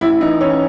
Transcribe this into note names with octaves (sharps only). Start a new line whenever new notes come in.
A1 E4
E3 D#4
E3 C#4